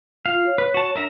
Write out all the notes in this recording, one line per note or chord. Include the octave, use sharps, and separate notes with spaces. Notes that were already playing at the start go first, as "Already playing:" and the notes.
F4 F5
C#5
B4
F#4 A5
D4 A#4 E5 A#5